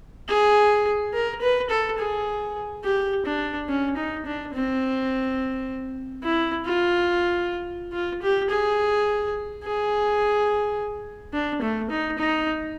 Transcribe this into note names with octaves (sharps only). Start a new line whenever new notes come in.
G#4
A#4
B4
A4
G#4
G4
D4
C#4
D#4
D4
C4
E4
F4
F4
G4
G#4
G#4
D4
A3
D#4
D#4